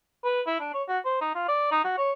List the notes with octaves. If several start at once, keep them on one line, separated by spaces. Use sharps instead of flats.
B4
E4
D4
C#5
F#4
C5
D#4
F4
D5
D#4
F#4
C#5